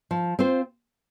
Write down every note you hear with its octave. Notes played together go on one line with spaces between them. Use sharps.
F3
C4 F4 C5